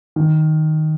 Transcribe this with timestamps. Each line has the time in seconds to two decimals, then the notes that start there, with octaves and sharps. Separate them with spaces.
0.16 D#3